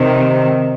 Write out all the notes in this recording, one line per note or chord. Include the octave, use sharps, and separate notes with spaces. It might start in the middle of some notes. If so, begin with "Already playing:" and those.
Already playing: C3 D#3